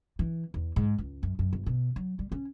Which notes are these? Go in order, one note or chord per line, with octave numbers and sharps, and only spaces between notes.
E3
E2
G#2
C#2
F#2
F#2
G1
B2
F#3
G3
C#4